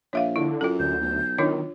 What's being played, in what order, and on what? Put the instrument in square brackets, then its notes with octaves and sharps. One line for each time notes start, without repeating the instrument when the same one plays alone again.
[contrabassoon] A#1 [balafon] C#5 E5 F5
[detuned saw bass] D3 [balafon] E4
[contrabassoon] F#2 [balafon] F4 A4
[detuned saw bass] D2 [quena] G6
[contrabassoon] B1
[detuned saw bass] D#3 [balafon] D4 F4 C#5